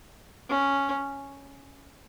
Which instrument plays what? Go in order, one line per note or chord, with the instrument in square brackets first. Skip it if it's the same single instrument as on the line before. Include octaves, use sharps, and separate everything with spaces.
[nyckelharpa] C#4